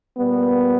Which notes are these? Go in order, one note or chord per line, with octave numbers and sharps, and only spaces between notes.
A#2 G3 B3